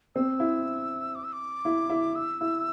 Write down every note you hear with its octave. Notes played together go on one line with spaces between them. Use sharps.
C4 E6
E4
D6
E6
D6
E4
E4
E6
E4